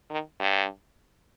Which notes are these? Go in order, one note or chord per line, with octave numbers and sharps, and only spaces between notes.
D#3
G2